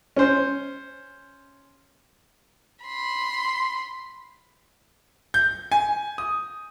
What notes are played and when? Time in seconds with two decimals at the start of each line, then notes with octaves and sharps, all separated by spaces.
0.16 C#4 C5
2.84 B5 C6
5.34 G6
5.72 G#5
6.18 D#6